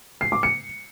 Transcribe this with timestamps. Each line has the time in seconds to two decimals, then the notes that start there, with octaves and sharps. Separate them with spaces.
0.21 C7
0.32 D6
0.43 C#7